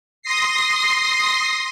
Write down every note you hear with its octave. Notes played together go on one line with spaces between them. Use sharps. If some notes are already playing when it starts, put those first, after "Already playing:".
C6 D#6 A#6 C7